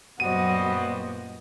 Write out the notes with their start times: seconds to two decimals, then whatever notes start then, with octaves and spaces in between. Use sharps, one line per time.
0.20 F#2 A#2 G3 B3 F#4 C5 D#5 D#7